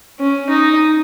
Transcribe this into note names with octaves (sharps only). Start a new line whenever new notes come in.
C#4
D#4